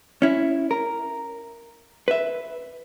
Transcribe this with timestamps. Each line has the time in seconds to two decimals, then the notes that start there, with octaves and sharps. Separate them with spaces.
0.22 C#4 E4
0.71 A#4
2.08 B4 E5